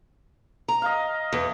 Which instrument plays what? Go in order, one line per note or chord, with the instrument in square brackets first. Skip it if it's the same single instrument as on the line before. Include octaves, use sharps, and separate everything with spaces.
[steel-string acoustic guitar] A#5
[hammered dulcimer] D#5 F5
[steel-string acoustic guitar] E2